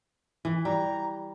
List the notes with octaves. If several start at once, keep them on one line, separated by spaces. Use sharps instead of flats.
E3
G3 A#5